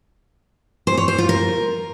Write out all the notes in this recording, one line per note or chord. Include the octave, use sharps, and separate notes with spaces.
C5
C#5
C5
F4
A#4